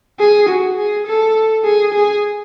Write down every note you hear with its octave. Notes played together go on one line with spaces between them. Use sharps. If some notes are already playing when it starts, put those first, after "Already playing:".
G#4
F#4
G#4
A4
G#4
G#4